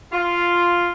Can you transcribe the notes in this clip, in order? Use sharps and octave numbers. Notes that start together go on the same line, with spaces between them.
F4